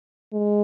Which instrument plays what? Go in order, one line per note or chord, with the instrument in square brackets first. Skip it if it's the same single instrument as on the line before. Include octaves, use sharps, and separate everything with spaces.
[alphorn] G#3